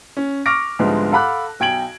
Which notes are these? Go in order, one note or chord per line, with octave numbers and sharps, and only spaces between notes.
C#4
C#6 D6 F6 A#6 D7
C2 G#2 D3 F3 G#3 B3
A4 F5 F#5 B5 D6 F#6
B1 G5 G#6 D7 F#7